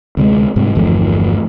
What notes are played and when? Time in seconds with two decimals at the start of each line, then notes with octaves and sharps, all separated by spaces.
0.17 D2 C3 F#3 G#3
0.56 G#2 C3 G3
0.75 G1 E2 F3 A3